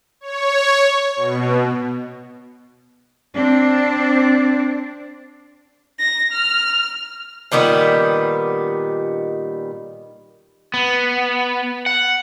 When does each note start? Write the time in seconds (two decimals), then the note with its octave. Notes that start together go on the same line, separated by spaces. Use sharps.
0.21 C#5
1.16 B2
3.35 C4 D4
5.99 A#6
6.32 F6
7.52 A#2 D#3 G3 B3
10.74 B3
11.86 F#5